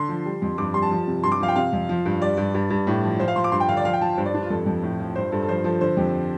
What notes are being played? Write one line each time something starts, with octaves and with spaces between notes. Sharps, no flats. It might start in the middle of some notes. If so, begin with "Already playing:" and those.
Already playing: D3 C6
F3
G3
F2
G2 D6
G3 C6
A5
F3
C3
G2 C6
D6
F3 F5
G5
C3 F5
F2
F3
G2
G3 D5
G2
G2
G2
A2
F3
F3 C5
F5
F3 C6
D6
G2 C6
G5
D3 F5
D5
F3 F5
G5
F3 A5
G2 C5
D5
G2 D4
F4
F2 A4
F2
A2
F3
G2 C5
G2 A4
A4
F3 C5
F3 A4
D3 C5
F2 G4